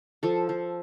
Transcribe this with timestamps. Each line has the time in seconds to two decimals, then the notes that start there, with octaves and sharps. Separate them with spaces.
0.23 F3 A4
0.49 F3